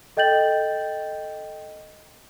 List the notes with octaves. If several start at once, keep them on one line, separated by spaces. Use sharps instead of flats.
A4 D#5 G5 G6 A6 F#7